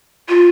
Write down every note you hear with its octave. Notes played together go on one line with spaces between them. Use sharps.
F4